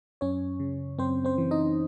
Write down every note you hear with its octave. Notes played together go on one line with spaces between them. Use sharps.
F#2 C#4 C#5
C#3
F#2 C4 C5
C4 C5
E3
D#4 D#5